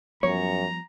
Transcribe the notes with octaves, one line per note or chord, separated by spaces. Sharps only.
F#2 F3 G3 B3 C#5 A#5